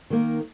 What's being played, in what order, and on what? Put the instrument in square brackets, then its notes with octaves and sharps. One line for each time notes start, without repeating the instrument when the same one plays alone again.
[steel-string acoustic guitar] D#3 A#3